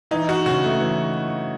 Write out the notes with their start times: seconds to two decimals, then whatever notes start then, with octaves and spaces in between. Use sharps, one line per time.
0.11 E3 D#4
0.29 D#4 F#4
0.45 C#3 F#4
0.64 A3
0.80 E3